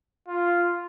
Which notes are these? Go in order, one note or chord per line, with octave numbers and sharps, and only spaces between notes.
F4